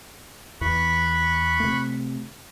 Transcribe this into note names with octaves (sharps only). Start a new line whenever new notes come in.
E2 E3 B5 C#6 F#6
C3 A3